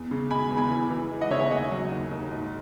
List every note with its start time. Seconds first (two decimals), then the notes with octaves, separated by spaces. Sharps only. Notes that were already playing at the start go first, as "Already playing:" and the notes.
Already playing: E2
0.11 C#3
0.31 G#3 G#5 B5
0.51 E2
0.57 G#5 B5
0.71 E3
0.90 E3
1.11 G#3
1.21 D#5 F#5
1.31 C#3 C#5 E5
1.41 E5 G#5
1.51 D#2 D#5 F#5
1.71 F#3
1.91 D#2
2.11 D#2
2.31 G#2